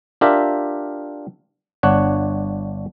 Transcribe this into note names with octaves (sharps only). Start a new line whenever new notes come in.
D4 F4 G4 A#4 E5
G1 D4 C#5 F#5